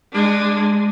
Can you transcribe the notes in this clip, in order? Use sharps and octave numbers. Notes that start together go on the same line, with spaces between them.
G#3 D4